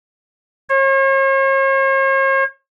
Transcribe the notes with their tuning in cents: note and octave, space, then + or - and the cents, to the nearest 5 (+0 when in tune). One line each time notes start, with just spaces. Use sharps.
C#5 -45